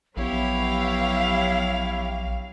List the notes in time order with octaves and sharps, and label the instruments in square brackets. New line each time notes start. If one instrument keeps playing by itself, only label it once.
[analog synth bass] A#1 [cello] F#3 F5 [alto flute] B3 [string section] E4 G4 C#5